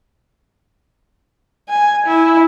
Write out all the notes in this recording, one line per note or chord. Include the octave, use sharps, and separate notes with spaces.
G#5
E4